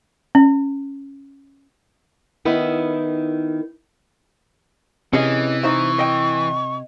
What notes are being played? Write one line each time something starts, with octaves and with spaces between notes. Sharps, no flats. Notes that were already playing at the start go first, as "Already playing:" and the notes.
C#4
D#3 B3 E4
C3 E3 C#4 G#4 D#5
D#4 C5 E5 C#6
D#5 G5